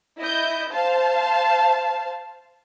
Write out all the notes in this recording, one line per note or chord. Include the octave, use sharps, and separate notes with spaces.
E4 D#5 G6
C5 F5 A5